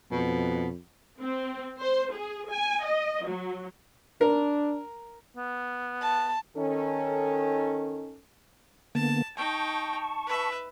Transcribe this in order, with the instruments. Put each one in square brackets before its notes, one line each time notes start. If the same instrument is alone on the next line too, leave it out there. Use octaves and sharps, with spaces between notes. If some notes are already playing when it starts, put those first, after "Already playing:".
[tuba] F2 [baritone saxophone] B2
[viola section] C4
C5
G#4
G#5
D#5
F#3
[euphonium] D4 [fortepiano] A#4
[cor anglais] B3
[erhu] A5
[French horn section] D#3 C#4 A4
[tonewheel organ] D3 A#3 B3 [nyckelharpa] A5
[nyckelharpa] D#4 G5 [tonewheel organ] A5 C#6
[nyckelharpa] B4 E5